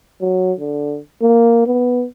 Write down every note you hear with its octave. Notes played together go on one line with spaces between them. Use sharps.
F#3
D3
A#3
B3